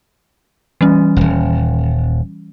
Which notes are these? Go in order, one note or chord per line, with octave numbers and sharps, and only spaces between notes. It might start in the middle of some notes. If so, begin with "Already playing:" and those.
E3 G3 C#4
D#1 G#1